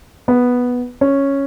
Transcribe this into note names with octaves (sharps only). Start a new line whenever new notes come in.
B3
C#4